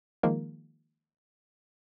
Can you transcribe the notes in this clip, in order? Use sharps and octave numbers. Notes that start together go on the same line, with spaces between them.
D#3 F3 G#3 A#3 A#4